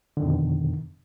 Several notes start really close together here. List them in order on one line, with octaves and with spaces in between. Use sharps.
D3 D#3 F2 B2